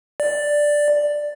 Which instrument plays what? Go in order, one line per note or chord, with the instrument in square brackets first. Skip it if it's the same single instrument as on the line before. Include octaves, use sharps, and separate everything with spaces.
[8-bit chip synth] D5